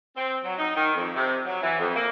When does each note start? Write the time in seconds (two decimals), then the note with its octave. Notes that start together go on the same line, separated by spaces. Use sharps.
0.17 C4
0.44 F#3
0.58 D#4
0.76 D#3
0.95 F2
1.15 C3
1.46 F#3
1.62 E3
1.79 F2
1.96 A#3